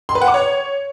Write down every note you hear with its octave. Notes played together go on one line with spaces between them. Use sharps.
C6
B4
F#5
D6
C#5